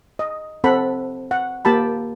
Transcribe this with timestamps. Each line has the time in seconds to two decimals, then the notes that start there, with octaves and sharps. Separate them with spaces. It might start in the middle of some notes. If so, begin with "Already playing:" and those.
0.19 D#5
0.64 C4 A4 F#5 B5
1.31 F#5
1.65 A#3 G4 A5 B5